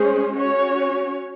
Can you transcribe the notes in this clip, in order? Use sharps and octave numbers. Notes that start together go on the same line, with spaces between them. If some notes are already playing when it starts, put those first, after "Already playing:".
Already playing: G#3 C#4 G#4 C5
C#4 F#4 C#5